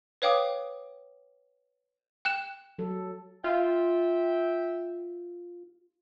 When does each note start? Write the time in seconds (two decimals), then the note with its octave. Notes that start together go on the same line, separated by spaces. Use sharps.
0.22 B4 C#5 F5 G5 D6 D#6
2.25 G5 F#6 E7
2.79 F#3 A4
3.44 F4 E5 G5